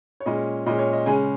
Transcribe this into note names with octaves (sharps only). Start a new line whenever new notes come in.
C#5
A#2 G#3 C#4 D#5
A#2 G#3 C#4 D#5
C#5
D#5
C#3 G#3 C#4 G#5